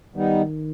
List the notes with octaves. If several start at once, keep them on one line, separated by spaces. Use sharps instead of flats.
D#3 G3 B3 D#4